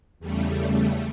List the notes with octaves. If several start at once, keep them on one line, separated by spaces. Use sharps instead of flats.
E2 C#3 G3 A3